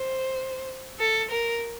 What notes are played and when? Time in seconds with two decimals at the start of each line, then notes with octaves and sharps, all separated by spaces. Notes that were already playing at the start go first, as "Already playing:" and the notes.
Already playing: C5
1.00 A4
1.31 A#4